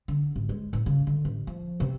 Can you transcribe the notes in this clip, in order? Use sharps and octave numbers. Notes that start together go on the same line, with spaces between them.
D3
G#1
G#3
A2
C#3
D3
A1
F3
C3